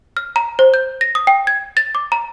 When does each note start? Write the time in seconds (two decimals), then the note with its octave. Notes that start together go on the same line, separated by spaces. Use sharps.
0.17 F6
0.36 A#5
0.59 C5
0.74 G6
1.01 A#6
1.15 D#6
1.27 G5
1.47 G#6
1.77 A6
1.95 D6
2.12 A#5